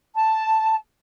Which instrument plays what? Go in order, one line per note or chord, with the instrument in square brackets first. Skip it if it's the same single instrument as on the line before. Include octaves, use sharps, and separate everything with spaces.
[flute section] A5